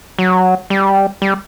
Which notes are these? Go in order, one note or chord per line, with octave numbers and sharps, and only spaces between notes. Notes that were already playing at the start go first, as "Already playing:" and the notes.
F#3
G3
G3